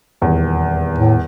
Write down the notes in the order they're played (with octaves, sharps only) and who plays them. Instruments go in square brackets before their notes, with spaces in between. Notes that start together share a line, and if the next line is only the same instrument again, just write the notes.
[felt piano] D#1 E2
[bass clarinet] A2